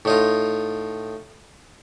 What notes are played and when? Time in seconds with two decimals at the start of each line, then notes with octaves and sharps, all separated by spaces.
0.05 A2 D#4 F4